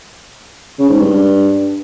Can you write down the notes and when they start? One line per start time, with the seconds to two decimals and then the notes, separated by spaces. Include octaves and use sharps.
0.79 C#3
0.89 G#2
1.00 G2